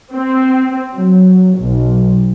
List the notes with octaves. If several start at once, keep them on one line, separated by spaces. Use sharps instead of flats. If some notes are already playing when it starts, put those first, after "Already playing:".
C4
F#3
B1